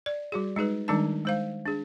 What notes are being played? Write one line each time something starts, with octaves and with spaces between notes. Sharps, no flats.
D5
G3 F#4 G#4
G#3 D#4 G#4 B4
D#3 G3 G#3 D4 D#4 A5
G#3 C5 F5
D4 G#4